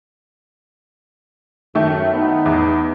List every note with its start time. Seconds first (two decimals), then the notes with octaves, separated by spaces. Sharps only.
1.75 F#2 D#3 A3 E4
2.12 B3 D#4
2.46 E2